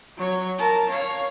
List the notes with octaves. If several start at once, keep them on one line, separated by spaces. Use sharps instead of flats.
F#3 C#5
A#4 A5
C#5 F5